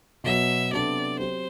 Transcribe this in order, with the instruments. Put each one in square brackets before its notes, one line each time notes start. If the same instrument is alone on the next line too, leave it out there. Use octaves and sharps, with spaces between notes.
[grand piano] B2 F#3 B3 F#4 [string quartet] E5
[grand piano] C3 F#3 B3 D4 A4 [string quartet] D5
[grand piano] F#3 C4 G4 [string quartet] C5